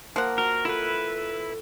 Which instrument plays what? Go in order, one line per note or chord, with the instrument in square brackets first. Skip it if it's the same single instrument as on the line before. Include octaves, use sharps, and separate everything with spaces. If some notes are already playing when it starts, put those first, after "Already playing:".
[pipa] F3 F#5 [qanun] A#3 A#4
[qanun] F#4 C6 [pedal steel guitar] A#4
[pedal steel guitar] E4 B4 [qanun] F4 [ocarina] A4